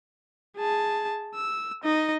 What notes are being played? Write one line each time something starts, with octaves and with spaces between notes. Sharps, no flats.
G#4 A5
E6
D#4 D#5